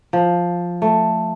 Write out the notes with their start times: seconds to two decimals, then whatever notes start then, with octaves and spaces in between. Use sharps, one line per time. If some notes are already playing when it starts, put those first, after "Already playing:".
0.13 F3
0.82 A3